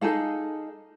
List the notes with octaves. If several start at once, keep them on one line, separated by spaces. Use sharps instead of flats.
D#4 G#4 A4 F5